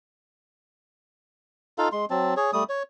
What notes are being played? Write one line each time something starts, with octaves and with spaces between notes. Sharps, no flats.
D#4 F4 A4 F5
G#3 C6
F#3 C4 A5
G#4 C#5
G3 A3 D#6
C#5